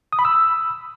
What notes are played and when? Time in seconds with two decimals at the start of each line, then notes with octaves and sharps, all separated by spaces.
0.13 D#6
0.19 B5
0.25 E6